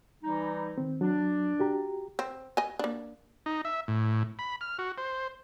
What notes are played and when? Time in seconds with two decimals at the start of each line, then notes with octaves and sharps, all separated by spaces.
0.23 E3 G3 D#4
0.78 D#3 C4
1.01 F#3 D4
1.59 F#4 G4 A#5
2.19 C4
2.57 D#5 G#5
2.79 A#3 D4
3.46 D#4
3.65 E5
3.88 A2
4.39 B5
4.61 F6
4.79 F#4
4.98 C5